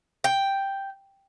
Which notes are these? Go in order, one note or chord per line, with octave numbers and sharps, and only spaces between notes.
G5